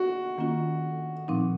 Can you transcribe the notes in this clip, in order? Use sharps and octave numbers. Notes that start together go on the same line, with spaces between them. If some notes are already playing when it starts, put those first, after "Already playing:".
Already playing: F#4
D#3 A#3 C#4 F4
A#2 F3 C4 D#4